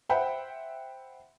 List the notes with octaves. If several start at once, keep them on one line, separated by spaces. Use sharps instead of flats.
C5 E5 F#5 G5 B5